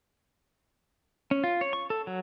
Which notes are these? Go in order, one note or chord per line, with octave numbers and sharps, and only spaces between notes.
C#4
F4
C#5
C#6
A4
F#3